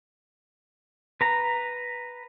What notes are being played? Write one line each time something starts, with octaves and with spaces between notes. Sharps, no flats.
B4 A#5